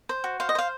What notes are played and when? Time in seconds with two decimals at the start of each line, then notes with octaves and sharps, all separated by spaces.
0.09 C5
0.24 F#4
0.40 C5 F5
0.49 D#5
0.55 C5 F5